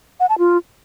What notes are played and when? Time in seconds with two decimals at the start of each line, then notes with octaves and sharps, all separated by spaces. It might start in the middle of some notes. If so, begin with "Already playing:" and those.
0.20 F#5
0.29 A5
0.39 F4